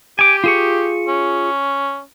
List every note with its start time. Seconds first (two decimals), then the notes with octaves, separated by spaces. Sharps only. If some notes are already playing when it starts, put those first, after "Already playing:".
0.19 G4 G#5 D6
0.44 F4 G#4 C#6
1.08 C#4